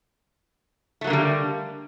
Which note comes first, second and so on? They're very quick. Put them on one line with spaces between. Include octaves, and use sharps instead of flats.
A3 F#3 A#3 D3 G3